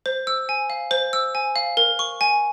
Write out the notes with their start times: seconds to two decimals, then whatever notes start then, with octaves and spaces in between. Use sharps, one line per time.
0.06 C5
0.27 E6
0.49 G#5
0.70 F5
0.91 C5
1.13 E6
1.35 G#5
1.56 F5
1.77 A#4
1.99 C#6
2.21 G#5